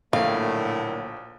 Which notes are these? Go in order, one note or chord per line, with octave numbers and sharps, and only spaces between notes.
A#1 A2 D3 F#3 A3 A#3 F5